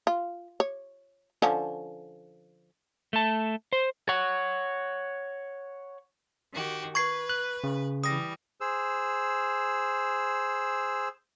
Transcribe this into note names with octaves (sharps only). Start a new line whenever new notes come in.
F4
C#5
D3 F3 C#4
A3 A5
C5
C#5 F#5
D#3 F#4 G4
B4 C#6 G#6 C7
F#6
C#3
E3 G3 D#6 A#6
G#4 C5 E6